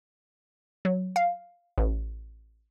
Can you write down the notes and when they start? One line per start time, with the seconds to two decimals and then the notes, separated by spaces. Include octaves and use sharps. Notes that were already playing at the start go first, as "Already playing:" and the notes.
0.85 F#3
1.16 F5
1.78 A1